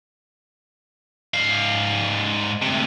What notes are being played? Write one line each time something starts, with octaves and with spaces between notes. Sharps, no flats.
G#2 F5
D2 C3